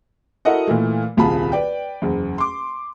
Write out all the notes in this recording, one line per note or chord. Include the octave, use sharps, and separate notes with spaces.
E4 F#4 A4 A#4 D#5 F#5
A#2 E3 A3
D#1 C2 F4 G#4 A5 B5
B4 D5 G5
F#1 E2
C6 D6